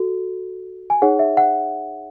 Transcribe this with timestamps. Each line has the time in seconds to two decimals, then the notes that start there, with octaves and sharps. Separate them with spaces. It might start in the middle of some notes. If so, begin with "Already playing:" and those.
Already playing: F#4 A4
0.90 G#5
1.02 D#4 G#4 C#5 F#5
1.19 E5
1.37 F#5